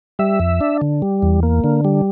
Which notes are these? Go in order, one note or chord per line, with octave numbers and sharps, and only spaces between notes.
G3 E5
F2
D4
D3
G3
E2
A#3
D3
G3